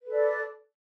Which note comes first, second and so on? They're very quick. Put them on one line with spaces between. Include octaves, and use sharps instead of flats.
B4 A4 D5